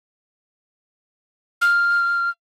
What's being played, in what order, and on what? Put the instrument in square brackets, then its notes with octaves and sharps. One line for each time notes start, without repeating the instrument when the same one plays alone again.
[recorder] F6